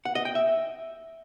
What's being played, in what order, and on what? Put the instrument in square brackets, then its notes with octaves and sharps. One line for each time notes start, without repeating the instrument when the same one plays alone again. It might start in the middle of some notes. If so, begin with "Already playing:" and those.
[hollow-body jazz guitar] F#5
D#5
G5
E5